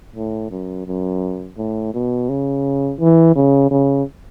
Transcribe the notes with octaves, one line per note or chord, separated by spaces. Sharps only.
A2
F#2
F#2
A2
B2
C#3
E3
C#3
C#3